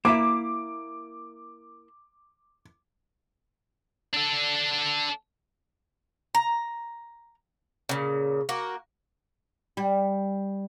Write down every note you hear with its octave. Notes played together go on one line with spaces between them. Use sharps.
A#3 E4 E5 D6
D4 A4
A#5
A#2 C#3
A#3 F#4
G3